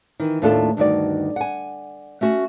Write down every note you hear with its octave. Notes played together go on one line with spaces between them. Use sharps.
D#3 E3
D#2 A2 A3 D4 F4 A4
D2 G2 D#3 F#4 D5
F#5 G#5
A3 C#4 F#4